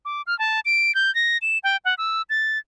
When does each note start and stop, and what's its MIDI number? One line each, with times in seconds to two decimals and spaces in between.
0.05 0.22 86
0.27 0.37 89
0.39 0.60 81
0.65 0.94 98
0.95 1.13 91
1.15 1.38 94
1.42 1.58 100
1.64 1.77 79
1.85 1.94 78
1.98 2.22 88
2.30 2.58 93